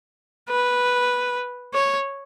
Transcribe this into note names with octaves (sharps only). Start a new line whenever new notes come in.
B4
C#5